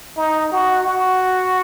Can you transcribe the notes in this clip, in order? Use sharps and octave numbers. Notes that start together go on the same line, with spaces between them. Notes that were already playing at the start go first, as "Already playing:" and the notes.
D#4
F#4
F#4